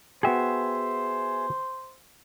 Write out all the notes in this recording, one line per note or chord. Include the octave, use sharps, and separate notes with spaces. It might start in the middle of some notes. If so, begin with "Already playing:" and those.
B3 F#4 G#4 C5 E5 G5